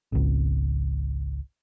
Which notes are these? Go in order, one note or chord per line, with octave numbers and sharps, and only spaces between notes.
G#1 C#2